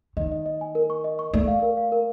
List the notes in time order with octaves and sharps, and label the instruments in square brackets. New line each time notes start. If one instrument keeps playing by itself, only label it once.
[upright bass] D#3 [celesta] D#5
[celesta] D#5
D#5
G#5
A#4
C#6
D#5
C#6
[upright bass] A3 [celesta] D5
[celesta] F5
A#4
F5
A#4